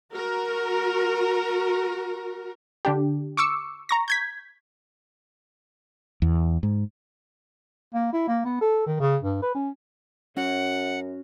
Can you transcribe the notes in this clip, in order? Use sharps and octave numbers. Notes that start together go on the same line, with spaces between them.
F#4 A#4
D3 D4 G4
C#6 D6 E6 C#7
A#5 C#6 A#6
G6 G#6 B6
E2
G#2
A#3
E4
A#3
B3
A4
D#3
C#3
G2
B4
C#4
F#2 C#4 F#4 C#5 F#5